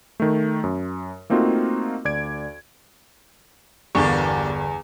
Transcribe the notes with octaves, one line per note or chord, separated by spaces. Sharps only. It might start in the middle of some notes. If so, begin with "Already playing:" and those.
D#3 A3
F#2
A3 A#3 C4 D#4 F4 F#4
D2 D5 G#6 D7
G1 E2 A#3 D4 G4 C#6